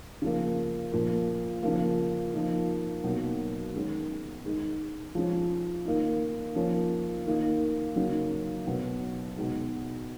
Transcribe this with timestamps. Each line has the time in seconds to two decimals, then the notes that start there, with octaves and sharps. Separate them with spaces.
0.22 C#3 F3 A#3
0.92 A#2 F3 A#3
1.63 C#3 F3 A#3
2.33 F3 A#3 D#4
3.04 B2 F#3 A#3 D#4
3.74 D#3 G#3 C#4
4.44 D#3 G#3 D#4
5.15 F3 G#3 C#4
5.85 D#3 A#3 D#4
6.56 F3 A#3 C#4
7.26 D#3 A#3 D#4
7.96 C#3 F#3 A#3 D#4
8.67 B2 F#3 B3
9.37 B2 G#3 D#4